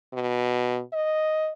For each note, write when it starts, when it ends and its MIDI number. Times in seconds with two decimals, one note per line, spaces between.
0.13 0.80 47
0.93 1.52 75